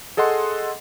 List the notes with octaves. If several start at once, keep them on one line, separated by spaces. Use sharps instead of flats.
G#4 A4 D#5 F#5 C6